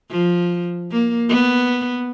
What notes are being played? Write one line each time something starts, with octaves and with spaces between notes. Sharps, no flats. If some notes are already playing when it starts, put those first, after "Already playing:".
F3
A#3
B3